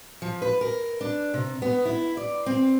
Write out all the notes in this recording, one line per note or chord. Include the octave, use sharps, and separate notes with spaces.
F3
B4
A#4
D4
C3
B3
E4
D5
C4